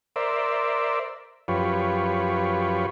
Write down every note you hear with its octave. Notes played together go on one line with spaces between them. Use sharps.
A#4 C5 D5 E5
F#2 F3 F4 G4 B4 C#5